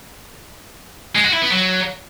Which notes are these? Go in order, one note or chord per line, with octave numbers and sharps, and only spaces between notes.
G#3
F#4
E4
B3
F#3